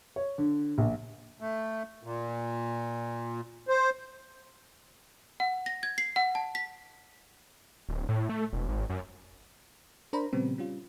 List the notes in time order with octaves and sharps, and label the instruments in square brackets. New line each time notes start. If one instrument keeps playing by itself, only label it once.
[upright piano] C#5
D3
A#1
[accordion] A3
A#2
C5
[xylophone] F#5
A#6
G#6
C7
F#5
A5
B6
[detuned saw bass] D1
A2
A3
E1
G#1
F#2
[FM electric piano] D4 A#4 C5 A#5 B5
A#2 C#3 F3 G3 B3 C4
G3 C#4 F4